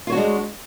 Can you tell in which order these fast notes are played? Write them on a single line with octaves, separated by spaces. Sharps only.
F4 C#5 F#4 D4 G#3